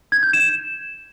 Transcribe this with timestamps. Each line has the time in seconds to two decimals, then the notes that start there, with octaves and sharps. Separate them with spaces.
0.12 G#6
0.23 G6
0.33 E7